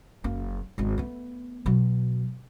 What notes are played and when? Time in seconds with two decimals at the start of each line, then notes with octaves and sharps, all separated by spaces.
0.24 F#1 A#3
0.78 G#1 G#3
0.98 A3 B3
1.66 B2 F#3